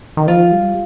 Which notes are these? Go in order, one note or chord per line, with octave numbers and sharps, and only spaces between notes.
D#3
F3 F4
G3